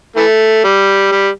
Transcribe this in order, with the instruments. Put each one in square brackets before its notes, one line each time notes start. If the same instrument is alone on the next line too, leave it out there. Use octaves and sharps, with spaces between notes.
[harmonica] E3 A3
G3
G3